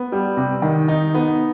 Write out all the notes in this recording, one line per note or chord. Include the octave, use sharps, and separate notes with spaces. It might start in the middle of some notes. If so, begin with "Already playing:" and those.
Already playing: B3
G3
C3
D#3
D#4
B3